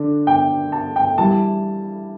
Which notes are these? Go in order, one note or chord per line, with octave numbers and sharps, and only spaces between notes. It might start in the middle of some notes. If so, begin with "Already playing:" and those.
Already playing: D3 D4
G5
A5
G5
E3 G3 E4 A5